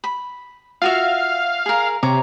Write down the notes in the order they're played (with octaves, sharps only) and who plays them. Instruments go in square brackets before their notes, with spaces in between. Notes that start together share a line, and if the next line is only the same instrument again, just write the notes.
[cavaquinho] B5
[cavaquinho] F4 F#4 E5 [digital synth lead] F5
[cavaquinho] G#4 A#4
[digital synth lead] C3 [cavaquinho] C#5 A#5 D6